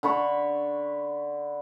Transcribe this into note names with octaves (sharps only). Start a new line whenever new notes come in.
D3 B5 C#6